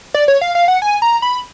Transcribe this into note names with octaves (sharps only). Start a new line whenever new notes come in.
D5
C#5
F5
F5
F#5
G#5
A#5
B5